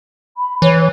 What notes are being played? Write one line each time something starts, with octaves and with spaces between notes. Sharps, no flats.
B5
E3 C#5